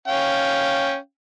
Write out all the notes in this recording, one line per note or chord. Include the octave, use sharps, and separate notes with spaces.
C#4 F5 G5